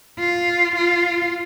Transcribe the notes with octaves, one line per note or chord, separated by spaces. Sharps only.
F4
F4